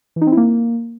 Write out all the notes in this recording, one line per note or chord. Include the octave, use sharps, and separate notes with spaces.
E3
D#4
C4
E4
A#3